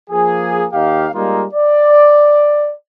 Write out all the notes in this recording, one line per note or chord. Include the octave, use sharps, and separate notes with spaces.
F3 A#3 G#4
D#2 D#4 G4 F5
G3 G#3 A#3 D#4 F4
D5